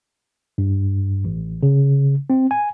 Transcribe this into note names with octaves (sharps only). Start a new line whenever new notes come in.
G2
A1
C#3
C4
G#5